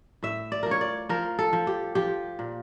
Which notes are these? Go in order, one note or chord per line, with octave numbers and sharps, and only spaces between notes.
A2 E5
D5
F3 A#4
C#5
D5
F3 A#4
A4
F3
G4
F3 G4
A#2